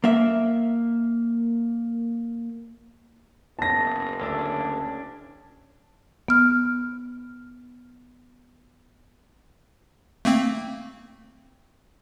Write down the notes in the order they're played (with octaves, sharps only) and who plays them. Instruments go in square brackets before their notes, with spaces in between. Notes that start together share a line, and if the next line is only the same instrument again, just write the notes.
[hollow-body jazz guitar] A#3 E5
[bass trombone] F#1 [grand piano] B3 C#4 [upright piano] A5 A#6
[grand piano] D2 E6 [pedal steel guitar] C#4 D4
[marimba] B3 F6
[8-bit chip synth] A3 A#3 C4